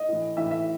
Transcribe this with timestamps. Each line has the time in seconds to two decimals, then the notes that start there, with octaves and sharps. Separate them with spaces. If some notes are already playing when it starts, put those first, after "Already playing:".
Already playing: D#5
0.08 A2 E3
0.37 A2 E3 E5
0.51 E5